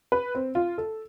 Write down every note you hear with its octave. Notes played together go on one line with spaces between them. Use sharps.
B4
C4
F4
A4